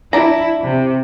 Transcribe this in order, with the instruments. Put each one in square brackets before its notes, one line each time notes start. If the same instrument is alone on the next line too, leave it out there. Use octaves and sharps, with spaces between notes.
[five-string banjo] D4 A#5 [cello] E4
[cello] C3